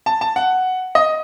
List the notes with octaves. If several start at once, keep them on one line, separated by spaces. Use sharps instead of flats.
A5
A5
F#5
D#5